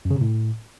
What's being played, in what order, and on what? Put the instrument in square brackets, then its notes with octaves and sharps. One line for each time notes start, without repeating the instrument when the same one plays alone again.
[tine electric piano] F#2
C#3
C3
A2